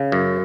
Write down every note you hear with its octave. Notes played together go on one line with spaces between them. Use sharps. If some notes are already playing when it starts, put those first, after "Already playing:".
Already playing: C#3
F#2